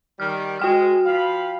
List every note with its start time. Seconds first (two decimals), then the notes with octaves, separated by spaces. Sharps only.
0.20 D#3 G3 F6
0.59 G#3 F#4 G5 F6
1.06 F3 F5 B5